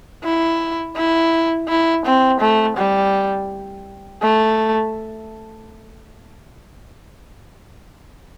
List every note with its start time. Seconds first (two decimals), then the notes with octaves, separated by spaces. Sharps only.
0.24 E4
0.97 E4
1.69 E4
2.05 C4
2.40 A3
2.76 G3
4.22 A3